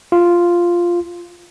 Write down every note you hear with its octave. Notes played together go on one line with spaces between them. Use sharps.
F4